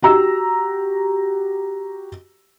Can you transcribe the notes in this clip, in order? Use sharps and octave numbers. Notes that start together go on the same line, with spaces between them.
F#4 G4 A#5 E6